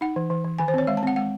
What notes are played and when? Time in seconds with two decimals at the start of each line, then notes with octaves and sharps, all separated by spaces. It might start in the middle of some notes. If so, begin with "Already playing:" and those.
0.01 D#4 F#5
0.16 E3
0.30 E3
0.44 E3
0.59 D#3 G#5
0.68 C5
0.74 C4 C#5
0.87 G#3 E5
0.97 A5
1.03 C4 F#5
1.16 G#3 F#5